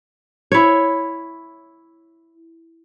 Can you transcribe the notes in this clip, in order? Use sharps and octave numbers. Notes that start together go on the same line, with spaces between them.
E4 C#5